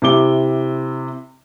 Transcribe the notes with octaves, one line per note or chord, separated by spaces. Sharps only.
C3 E4 D6 G7